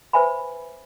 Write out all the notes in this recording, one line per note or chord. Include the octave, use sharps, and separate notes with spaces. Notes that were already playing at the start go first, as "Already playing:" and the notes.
B4 C5 E5 G#5 B5